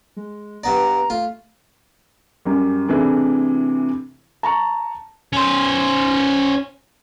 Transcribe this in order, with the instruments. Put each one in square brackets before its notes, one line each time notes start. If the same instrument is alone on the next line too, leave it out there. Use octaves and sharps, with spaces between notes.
[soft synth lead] G#3
[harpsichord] G2 B3 D5 [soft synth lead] A#5
[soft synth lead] A3 [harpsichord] F4
[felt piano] F#2 G3
C3 E3 A3 D4 E4 G#4
A5 A#5 C#6
[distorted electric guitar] C#4 C5